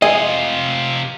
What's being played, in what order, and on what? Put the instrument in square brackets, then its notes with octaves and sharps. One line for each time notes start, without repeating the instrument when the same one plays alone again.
[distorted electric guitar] C3 F4 [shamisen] G#3 G#4 E5 [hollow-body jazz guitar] D#5